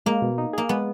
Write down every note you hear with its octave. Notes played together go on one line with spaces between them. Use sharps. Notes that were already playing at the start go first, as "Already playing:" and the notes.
G#3 A#3
B2
D#4
A#3 G#4
G#3 B3